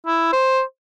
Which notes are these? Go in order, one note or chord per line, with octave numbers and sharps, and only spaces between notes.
E4
C5